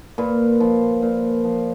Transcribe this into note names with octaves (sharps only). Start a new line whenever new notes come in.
A#2 B4
F3
A#2
F3